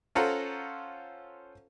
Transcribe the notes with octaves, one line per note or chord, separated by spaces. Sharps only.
C#4 F4 A4 C5 F#5 A#5